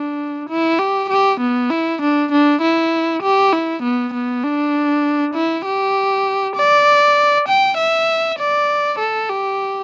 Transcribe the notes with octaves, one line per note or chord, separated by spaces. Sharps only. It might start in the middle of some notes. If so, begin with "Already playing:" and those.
Already playing: D4
E4
G4
G4
B3
E4
D4
D4
E4
G4
E4
B3
B3
D4
E4
G4
D5
G5
E5
D5
A4
G4